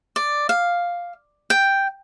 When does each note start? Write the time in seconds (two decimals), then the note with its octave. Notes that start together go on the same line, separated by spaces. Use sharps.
0.16 D5
0.49 F5
1.50 G5